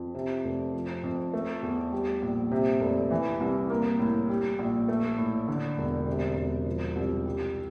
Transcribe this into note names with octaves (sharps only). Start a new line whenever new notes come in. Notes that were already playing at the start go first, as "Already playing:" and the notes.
Already playing: F2
C3
F1
F3
F2
A3
E2
G3
A#1
C3
F1
E3
C2
A#3
A2
G3
A#1
A3
A2
D3
E1
C3
E1
F3
C2
G3